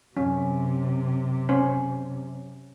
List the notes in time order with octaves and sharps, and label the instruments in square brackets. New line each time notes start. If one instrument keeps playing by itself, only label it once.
[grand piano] F#2 [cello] C3 [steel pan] C#4
[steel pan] C#4 C5